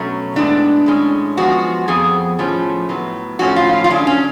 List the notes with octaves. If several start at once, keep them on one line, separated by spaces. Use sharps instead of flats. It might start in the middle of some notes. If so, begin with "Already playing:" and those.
Already playing: B2 F#3 A3 C#4
A2 G#3 B3 D4
A2 G#3 C#4
F#2 F3 G#3 B3 F#4
F2 F3 B3 G#4
A2 F3 A3 C#4
A2 F#3 B3
A2 F3 A3 C#4 F#4
F4
F4
F4
C#3 F#3 C#4 D4
C#4